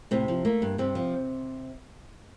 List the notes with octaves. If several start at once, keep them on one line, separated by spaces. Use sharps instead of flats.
A2 C3 C4
F3
A3 A#3
G2
G2 C3 C4
F3